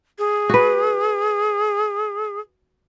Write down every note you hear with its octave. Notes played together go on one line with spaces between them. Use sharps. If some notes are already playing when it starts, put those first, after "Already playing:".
G#4
F#4 B4